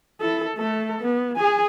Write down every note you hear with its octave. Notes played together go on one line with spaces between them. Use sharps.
E4 A4
A3 A4
B3
G#4 G#5